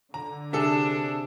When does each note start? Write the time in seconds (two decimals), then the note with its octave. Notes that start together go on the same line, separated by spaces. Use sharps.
0.14 D3 A#5
0.53 C3 D4 G#4 A4 E5